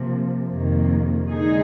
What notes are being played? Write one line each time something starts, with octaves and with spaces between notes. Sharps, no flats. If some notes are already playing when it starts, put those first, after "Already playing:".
Already playing: C3 F3 A#3
F2 C3 D#3 A#3
D3 G#3 D#4 G#4